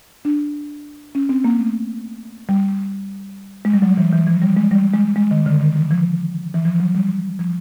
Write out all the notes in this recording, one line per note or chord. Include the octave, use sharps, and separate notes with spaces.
D4
C#4
C4
A#3
A3
G3
G#3
G3
F#3
E3
E3
F3
G3
G#3
G3
G#3
G#3
D#3
D3
D#3
E3
F3
E3
F3
F#3
G3
F3